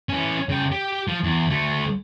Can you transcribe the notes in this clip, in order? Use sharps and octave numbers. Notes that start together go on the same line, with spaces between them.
E3 C#4
C#3 G5
G4
F3
E2
D2 A3